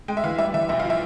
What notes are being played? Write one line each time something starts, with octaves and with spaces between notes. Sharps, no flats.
G#3 G5
E5
E3 F5
G3 E5
E3 E5
B1 E5
F3 F5
E5